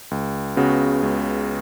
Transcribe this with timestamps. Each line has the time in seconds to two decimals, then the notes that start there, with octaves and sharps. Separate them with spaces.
0.11 C#2
0.56 C#3 B3 F#4
1.03 C#2